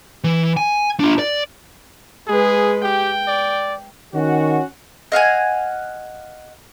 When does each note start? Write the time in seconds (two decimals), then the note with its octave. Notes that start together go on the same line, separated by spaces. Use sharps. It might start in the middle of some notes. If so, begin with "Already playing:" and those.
0.24 E3
0.57 G#5
1.00 D4 F4
1.19 D5
2.28 G#3 G#4 B4
2.84 G4 G5
3.28 D5
4.14 D#3 C#4 F#4
5.12 D#5 F5 F#5 G#5